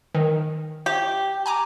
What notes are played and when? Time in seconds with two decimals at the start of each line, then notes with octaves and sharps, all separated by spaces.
0.15 D#3
0.86 G4
1.46 G#5 A#5 D6